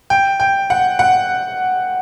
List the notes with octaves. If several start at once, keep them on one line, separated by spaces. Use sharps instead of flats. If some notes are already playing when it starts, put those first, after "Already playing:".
G5
G5
F#5
F#5